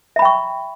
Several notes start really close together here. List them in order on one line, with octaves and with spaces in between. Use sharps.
E5 B5 G5 C#6